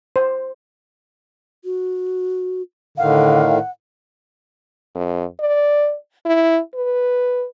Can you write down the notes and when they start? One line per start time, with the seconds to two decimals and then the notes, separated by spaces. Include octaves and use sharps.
0.16 C5
1.64 F#4
2.98 A2 D3 D#3 F5 F#5
4.95 F2
5.40 D5
6.25 E4
6.75 B4